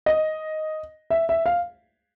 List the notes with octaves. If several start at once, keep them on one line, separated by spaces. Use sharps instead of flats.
D#5
E5
E5
F5